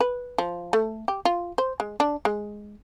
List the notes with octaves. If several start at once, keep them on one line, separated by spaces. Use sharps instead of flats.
B4
F3
A3
G4
F4
C5
G#3
D4
G#3